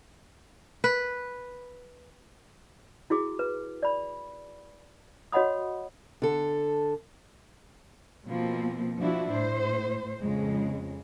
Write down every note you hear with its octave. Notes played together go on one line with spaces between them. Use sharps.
B4
E4 F#4 G#4 D6
B4
D5 B5
F#4 C#5 D#5 F#5 B5 D#6
D3 A4
B2 F3 A#3 C4
F3 D4 E4 F#4
A2 C5
F2 C#3 G#3